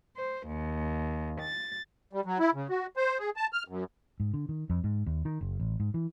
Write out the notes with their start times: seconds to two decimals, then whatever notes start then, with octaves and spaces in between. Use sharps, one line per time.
0.15 C5
0.46 D#2
1.40 A6
2.13 G3
2.25 F#3
2.39 E4
2.54 C#3
2.70 F#4
2.97 C5
3.19 G#4
3.36 A5
3.53 F6
3.68 F#2
4.20 G#2
4.34 D3
4.49 D#3
4.70 F2
4.84 G#2
5.06 D#2
5.25 D#3
5.41 F#1
5.60 A1
5.80 G#2
5.94 E3